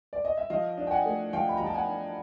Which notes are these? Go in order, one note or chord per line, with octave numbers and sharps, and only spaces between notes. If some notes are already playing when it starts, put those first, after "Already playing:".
D5
D#5
E5
F3 D#5 F5
D4
G5
F#5 G#5
A3
F3 F5 G5
B5
F3 A#5
A5
F#5 G#5
D4